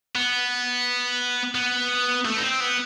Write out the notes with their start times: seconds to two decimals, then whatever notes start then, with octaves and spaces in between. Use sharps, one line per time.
0.15 B3
1.55 B3
2.25 A3
2.37 D#4
2.43 C4
2.60 B3